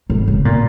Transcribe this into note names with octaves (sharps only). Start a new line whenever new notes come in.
G#2
C#3
A#2